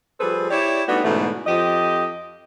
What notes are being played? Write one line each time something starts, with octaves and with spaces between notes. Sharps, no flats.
F3 G3 G#4 A4 B4 C5
E4 G4 C#5 D5
G3 A3 B3 D4 D#4 F#4
G#2 B2 D3 E3 A3 C#4
F2 F3 G4 D#5